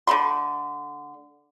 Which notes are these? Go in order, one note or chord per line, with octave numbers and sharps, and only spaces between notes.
D3 A3 B5 C6